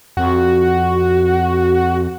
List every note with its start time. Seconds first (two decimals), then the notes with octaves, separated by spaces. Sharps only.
0.17 F2 F#4